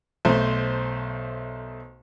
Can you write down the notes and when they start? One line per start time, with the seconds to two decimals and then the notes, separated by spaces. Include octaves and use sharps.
0.25 B1 A3 C5